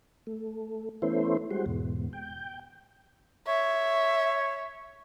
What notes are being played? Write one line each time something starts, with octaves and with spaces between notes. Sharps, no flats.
A3
E3 A3 B3 C#4 E4 C5
G3 G#3 F#4 C5
E2 G#2 B2
G5
C#5 E5